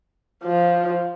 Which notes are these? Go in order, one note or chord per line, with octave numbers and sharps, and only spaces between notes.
F3